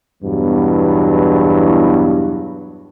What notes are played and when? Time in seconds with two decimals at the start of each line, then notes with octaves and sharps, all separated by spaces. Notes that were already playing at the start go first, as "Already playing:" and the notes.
0.23 E2 G2 B2 E3 F#3